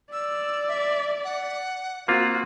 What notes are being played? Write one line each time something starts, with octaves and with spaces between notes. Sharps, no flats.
D5 E6
E5
F#5
A#3 C4 F4 F#4